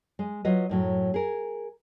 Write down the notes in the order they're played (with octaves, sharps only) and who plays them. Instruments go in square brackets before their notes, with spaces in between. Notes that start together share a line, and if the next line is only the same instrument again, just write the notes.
[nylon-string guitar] G#3
F#3 F4 B4 D#5
F#2 A2 F#3
G#4 A#4